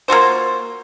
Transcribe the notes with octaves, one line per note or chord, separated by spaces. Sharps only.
A#3 F4 F#4 C5